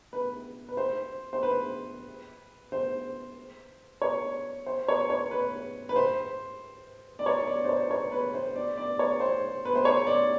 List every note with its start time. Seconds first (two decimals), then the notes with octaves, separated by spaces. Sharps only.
0.13 B4
0.69 B4
0.77 C5
1.33 C5
1.43 B4
2.72 C5
4.02 C#5
4.66 C5
4.88 C#5
5.10 C#5
5.31 B4
5.89 B4
5.96 C5
7.19 D5
7.26 C#5
7.47 D5
7.64 C5
7.69 C#5
7.91 C#5
8.12 B4
8.34 C5
8.56 D5
8.77 D5
8.99 C#5
9.20 C5
9.65 B4
9.76 C5
9.85 C#5
10.07 D5